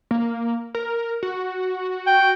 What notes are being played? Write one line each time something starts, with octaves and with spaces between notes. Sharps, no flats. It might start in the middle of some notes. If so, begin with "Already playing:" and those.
A#3
A#4
F#4
G5